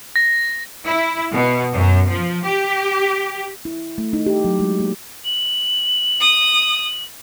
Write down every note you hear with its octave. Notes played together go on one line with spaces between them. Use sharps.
A#6
E4
B2
F#2
F3
G4
E4
A3
D#4
G4
F#3
G#3
A#3
F#7
D#6